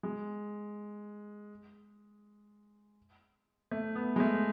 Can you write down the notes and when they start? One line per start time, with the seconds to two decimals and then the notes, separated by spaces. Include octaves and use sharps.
0.03 G#3
3.71 A3
3.95 B3
4.16 G#3
4.20 A3